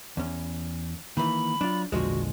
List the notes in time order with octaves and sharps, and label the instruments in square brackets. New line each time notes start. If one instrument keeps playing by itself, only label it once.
[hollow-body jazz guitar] E2 C#4
[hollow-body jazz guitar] D#3 E3 [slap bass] A#3 [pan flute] B5
[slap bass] F#3 [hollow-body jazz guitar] D4 F4
[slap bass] A#1 E2 A#2 [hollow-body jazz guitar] D3 F3 G#3 [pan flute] F#4